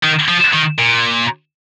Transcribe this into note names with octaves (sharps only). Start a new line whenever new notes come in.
D#3
F3
D#3
A#2